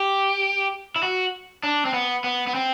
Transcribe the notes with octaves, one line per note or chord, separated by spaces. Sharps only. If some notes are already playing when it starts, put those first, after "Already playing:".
Already playing: G4
E4
F#4
D4
C4
B3
B3
B3
C4